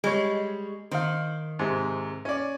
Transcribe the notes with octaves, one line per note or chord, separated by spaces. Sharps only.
G3 G#3 C#5
D#3 C5 F5
G#2 C3
C#4 D5